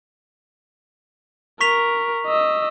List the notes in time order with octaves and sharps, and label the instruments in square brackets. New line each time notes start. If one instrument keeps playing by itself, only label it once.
[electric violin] A#4 [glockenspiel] C#6 B6 F7
[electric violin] D#5 E6